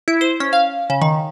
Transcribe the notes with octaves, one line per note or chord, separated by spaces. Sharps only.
E4
C5
C#4
F5
C#3
D#3